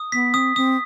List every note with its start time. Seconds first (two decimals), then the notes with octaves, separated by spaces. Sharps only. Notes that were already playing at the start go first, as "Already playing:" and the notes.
Already playing: D#6
0.12 B3 B6
0.34 C4 D#6
0.56 C4 D#6